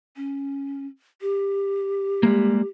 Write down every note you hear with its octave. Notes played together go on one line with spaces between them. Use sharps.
C#4
G4
G3 G#3 A#3